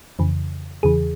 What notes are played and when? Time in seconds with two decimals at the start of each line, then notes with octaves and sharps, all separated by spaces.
0.19 F2 C#3 E3
0.83 E2 C#3 E3 G#4